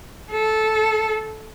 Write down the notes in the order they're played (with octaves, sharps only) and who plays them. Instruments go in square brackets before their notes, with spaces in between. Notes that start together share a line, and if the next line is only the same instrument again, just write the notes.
[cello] A4